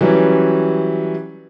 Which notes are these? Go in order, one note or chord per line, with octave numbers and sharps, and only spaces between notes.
E3 F#3 G3 C#4